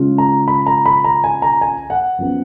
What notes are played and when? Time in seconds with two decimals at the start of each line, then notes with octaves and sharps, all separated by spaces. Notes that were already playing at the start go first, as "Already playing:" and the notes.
Already playing: C#3 G#3 C#4 F4
0.18 A#5
0.48 B5
0.66 A#5
0.86 B5
1.04 A#5
1.24 G#5
1.42 A#5
1.61 G#5
1.90 F#5
2.18 F#2 F3 B3